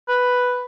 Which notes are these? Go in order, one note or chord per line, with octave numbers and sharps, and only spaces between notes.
B4